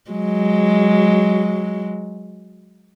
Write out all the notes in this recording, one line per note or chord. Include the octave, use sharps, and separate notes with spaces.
F#3 G#3